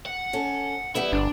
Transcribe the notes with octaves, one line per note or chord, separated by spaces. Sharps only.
F#5
C#4 A4
E3 G3 B3 E4
G1 D4